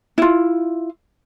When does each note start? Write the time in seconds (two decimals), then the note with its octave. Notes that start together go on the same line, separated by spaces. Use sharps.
0.18 E4 F4